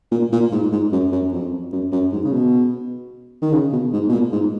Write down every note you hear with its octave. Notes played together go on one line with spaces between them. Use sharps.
A#2
A#2
G#2
G#2
F#2
F#2
F2
F#2
F#2
G#2
C#3
B2
D#3
C#3
B2
G#2
B2
A#2
G#2